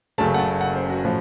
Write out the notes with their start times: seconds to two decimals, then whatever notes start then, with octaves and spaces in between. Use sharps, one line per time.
0.18 F#1 F#2 C#3 A3 A5
0.34 F#5
0.39 A5
0.61 F#5
0.75 C5
0.90 F#4
1.05 A2 F3